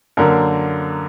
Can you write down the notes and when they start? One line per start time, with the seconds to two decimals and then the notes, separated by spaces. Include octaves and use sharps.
0.17 F#2 D3 A#3 A#4